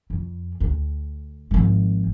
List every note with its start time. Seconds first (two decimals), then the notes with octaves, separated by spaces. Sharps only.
0.10 F2
0.60 D2
1.51 G#1 F3